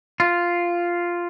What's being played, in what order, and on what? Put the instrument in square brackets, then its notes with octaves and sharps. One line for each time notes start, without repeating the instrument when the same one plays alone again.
[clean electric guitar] F4